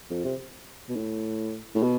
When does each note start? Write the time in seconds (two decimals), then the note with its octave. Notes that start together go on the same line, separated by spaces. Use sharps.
0.10 F2
0.25 C3
0.89 B2
0.96 A2
1.75 A2
1.83 B2